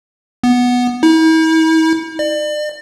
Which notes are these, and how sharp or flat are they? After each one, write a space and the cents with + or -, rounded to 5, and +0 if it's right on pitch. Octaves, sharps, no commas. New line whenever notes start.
B3 -5
E4 -45
D5 +35